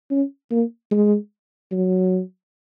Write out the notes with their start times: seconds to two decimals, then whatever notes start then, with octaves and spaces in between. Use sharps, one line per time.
0.11 C#4
0.51 A#3
0.91 G#3
1.72 F#3